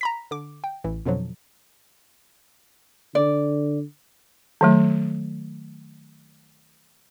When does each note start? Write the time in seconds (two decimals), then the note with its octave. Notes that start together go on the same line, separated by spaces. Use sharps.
0.01 A#5 B5 B6
0.31 D3 D6
0.64 G5
0.84 A1 E3
1.06 F2 B2 D3 F3 F#3
3.15 D3 D5
4.61 D#3 F#3 A3